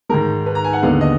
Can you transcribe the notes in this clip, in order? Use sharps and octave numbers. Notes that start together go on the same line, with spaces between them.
G#2 D#3 G#3 A#4
B4
A#5
G#5
F#5
D#2 D3 G#3 B3 F5
D#5